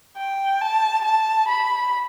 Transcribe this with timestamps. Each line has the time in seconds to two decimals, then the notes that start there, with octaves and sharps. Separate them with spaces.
0.17 G5
0.61 A5
1.04 A5
1.48 B5